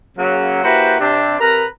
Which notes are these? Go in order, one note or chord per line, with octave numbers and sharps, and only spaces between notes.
C#3 F#3 A#3
A#3 E4 F#4 G4 B4 C5
C3 C4 D4
C3 A#4 B4 A#5